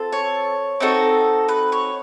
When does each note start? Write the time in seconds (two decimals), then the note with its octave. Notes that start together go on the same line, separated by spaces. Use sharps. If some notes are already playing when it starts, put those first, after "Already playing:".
Already playing: C4 F4 A4
0.12 C#5
0.80 C4 D#4 F#4 A4
1.48 B4
1.72 C#5